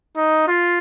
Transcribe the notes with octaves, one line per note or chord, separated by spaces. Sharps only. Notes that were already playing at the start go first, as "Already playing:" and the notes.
D#4
F4